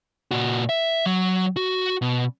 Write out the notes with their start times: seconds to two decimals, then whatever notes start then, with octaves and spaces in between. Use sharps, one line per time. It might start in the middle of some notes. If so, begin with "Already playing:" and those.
0.31 A#2 F#4
0.69 E5
1.06 F#3
1.56 F#4
2.02 B2